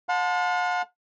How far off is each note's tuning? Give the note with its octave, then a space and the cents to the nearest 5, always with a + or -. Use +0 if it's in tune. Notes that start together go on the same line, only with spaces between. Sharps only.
F#5 -45 A5 +0 C6 -25